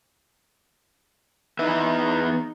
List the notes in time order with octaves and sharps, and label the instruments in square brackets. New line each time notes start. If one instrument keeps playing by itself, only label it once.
[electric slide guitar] E2 B4 E5 [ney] D#4